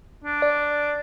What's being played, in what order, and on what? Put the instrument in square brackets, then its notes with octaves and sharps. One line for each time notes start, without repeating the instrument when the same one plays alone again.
[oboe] D4
[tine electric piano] D5